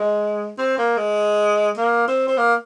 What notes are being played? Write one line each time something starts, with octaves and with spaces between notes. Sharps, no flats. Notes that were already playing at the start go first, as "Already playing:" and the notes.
Already playing: G#3
C4
A#3
G#3
A#3
C4
C4
A#3